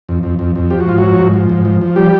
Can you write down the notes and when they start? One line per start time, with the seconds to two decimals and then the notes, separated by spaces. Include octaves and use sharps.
0.09 F2
0.23 F2
0.39 F2
0.56 F2
0.70 F3 G4
0.80 F#4
0.86 G#2 F4
0.98 F3 F#3 F#4
1.18 G#2
1.33 F3
1.50 G#2
1.65 F3
1.81 F3
1.96 G3 G4